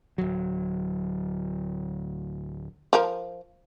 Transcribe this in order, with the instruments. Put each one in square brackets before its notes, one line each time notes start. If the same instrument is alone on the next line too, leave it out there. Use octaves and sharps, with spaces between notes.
[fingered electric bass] D1 F#3
[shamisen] F3 A#4